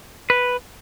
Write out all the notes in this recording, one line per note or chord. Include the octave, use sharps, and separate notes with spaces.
B4